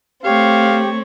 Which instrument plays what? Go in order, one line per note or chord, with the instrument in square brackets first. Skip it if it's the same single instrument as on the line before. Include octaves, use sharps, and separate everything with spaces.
[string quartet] A3 C4 [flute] G4 [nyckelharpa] C#5 C#6 [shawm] F5